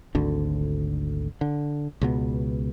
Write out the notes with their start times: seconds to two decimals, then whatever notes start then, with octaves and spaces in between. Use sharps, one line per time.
0.15 G#1 D2 D3
1.41 D3
2.01 C#2 B2 B3